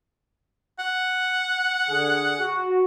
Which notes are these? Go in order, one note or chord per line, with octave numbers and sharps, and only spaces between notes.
F#5
D3 G#4
F#4